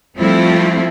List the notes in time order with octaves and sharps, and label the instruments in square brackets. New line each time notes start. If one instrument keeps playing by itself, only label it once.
[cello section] F3 G3 A3 C4 E4 F4